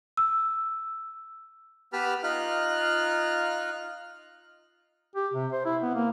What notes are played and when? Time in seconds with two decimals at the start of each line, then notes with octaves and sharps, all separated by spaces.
0.17 E6
1.93 B3 G4 B4 A5 B5 F6
2.23 D#4 F4 F6 F#6
5.16 G4
5.34 C3
5.52 C5
5.65 E4
5.82 B3
5.94 A#3